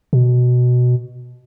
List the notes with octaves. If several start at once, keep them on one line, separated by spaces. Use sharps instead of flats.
B2